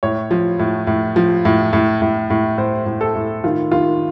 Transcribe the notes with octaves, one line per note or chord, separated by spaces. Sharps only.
A2 C#5
F3
A2
A2
F3
A2
A2
A2
A2
A2 C5
A2
A4
A2
D#3 F4
D#3 F4